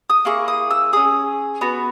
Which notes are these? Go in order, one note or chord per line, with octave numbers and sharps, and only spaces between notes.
D#6
A#3 E4 G#4 C#6
D#6
E6
C#4 E4 G#4 D#6
B3 F#4